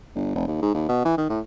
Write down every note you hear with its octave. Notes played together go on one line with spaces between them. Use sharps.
G1
F1
D#2
G#2
D#2
B2
E3
D#3
A2